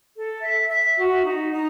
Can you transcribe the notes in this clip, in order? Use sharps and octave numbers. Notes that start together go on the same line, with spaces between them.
A4
E5
E5
F#4
D#4
D#4